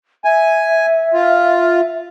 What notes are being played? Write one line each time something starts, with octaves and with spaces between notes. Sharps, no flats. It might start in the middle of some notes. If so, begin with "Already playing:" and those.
E5 G#5
F4